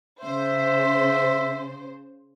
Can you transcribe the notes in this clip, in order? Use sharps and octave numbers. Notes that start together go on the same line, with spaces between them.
C#3 C5 E5